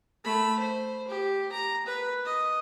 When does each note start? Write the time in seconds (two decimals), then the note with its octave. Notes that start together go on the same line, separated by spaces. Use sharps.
0.24 A3 B5
0.59 C5
1.08 G4
1.52 A#5
1.86 B4
2.25 D#5